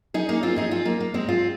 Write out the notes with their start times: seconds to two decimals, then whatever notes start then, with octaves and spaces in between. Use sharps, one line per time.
0.14 D#4 G#4
0.29 A#3 D#4
0.43 C4 F4
0.56 D#4 G#4
0.71 C4 F4
0.85 A#3 D#4
1.00 A#3
1.14 G#3 C4
1.28 C4 F4